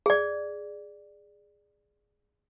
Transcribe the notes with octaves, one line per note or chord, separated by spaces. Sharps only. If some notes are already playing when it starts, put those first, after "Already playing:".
G#4 D5